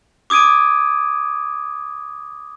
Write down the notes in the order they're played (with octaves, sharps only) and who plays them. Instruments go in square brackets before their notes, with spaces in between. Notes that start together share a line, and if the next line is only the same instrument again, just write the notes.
[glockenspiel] D6 D#6 G#6 D7 D#7